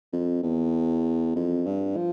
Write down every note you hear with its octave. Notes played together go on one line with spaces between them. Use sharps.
F2
E2
F2
G2
F3